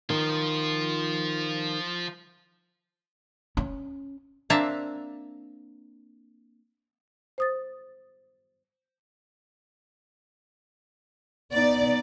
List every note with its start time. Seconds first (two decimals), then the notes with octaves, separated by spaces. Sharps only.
0.10 D#3 F3 F4
3.57 C#4
4.50 A#3 C4 D4 E5 A5 A#5
7.38 C5 D#6 A6
11.52 B3 D#4 D5